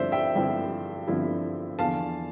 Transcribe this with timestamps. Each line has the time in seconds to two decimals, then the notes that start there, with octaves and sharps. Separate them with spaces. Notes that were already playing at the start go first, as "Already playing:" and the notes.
Already playing: G2 D3 F3 C4 E4 C5 D5 E5
0.12 E5 G5
0.35 G2 D3 F3 C4 E4 E5 G5
1.07 G2 D3 F3 C4 E4
1.79 E2 D3 F3 F5 A5